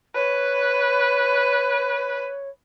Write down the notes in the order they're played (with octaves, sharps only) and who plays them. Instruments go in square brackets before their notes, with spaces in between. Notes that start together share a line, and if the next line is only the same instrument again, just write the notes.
[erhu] B4 [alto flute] C#5